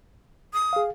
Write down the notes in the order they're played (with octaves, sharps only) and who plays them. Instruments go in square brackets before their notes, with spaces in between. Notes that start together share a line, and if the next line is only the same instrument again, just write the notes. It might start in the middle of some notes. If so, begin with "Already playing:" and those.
[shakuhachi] D#6
[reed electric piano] G#4 F5